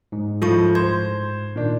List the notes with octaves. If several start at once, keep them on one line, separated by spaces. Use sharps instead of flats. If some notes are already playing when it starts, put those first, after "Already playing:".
G#2
A2 F3 F4 A4 C#6
C5 G#6
A#2 D#3 D4